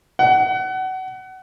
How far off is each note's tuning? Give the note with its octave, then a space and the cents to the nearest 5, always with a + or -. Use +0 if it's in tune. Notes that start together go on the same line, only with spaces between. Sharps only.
F#5 +25